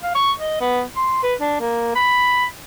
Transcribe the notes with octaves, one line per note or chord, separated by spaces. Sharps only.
F5
C#6
D#5
B3
C6
B4
D4
A#3
B5